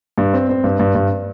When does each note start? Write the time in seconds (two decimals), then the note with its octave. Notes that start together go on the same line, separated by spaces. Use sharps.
0.18 G2
0.33 C4
0.49 C4
0.64 G2
0.79 G2
0.95 G2